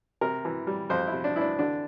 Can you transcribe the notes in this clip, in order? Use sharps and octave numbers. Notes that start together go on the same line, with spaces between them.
C3 A#4
E3
G3
F2 C5
E4
C3
D4
E3 D4 E4
D3 D4